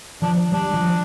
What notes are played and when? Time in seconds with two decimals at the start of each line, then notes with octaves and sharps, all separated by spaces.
0.22 F3 D4
0.52 G3 D4
0.74 F3